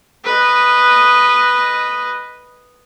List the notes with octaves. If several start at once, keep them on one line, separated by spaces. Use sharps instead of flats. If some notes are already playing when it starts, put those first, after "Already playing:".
B4 D#5